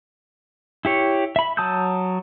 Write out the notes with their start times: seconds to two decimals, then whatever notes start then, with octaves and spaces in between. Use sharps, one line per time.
0.85 E4 G4 C#5
1.36 E5 B5
1.57 F#3 A5 D#6 E6 G6